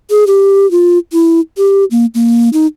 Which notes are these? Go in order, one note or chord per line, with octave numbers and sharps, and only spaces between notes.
G#4
G4
F4
E4
G4
A#3
A#3
D#4